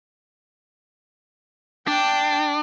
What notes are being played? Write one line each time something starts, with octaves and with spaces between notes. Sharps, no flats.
D4 G5